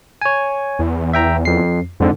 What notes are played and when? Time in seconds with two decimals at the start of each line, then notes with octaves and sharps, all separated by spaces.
0.22 C#5 G#5
0.79 E2
1.13 E5 G5 A#5
1.45 F2 C7
2.00 F2 G#2 D3